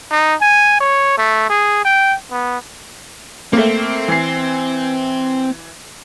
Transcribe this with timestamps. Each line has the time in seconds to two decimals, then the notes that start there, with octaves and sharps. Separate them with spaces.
0.12 D#4
0.41 G#5
0.80 C#5
1.18 A3
1.50 G#4
1.85 G5
2.32 B3
3.53 A3 A#3 C4
4.08 E3 C7